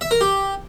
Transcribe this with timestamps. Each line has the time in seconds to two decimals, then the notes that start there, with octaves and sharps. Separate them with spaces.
0.01 E5
0.11 A#4
0.21 G4